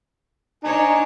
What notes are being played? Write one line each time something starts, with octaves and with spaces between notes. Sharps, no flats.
D4 D#4 C5 C#5 G#5